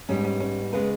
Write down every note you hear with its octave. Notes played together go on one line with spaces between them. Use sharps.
G#2 G3 B3 C#4
C#4
C#4
C#3 G#3 B3 B4